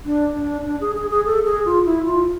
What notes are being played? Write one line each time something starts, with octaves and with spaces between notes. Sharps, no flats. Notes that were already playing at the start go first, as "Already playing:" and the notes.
D4
D4
D4
G#4
G#4
G#4
A4
G#4
F4
E4
F4